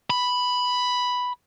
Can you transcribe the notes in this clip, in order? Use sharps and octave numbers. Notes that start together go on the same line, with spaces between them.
B5